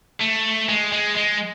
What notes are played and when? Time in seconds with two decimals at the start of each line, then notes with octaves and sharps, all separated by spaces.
0.21 A3
0.69 G#3
0.92 G#3
1.16 G#3